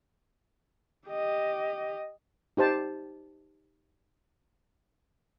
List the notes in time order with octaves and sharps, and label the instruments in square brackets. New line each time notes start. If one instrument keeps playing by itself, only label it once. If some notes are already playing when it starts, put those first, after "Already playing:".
[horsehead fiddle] G4 D#5
[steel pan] D#4 G4 C5 A5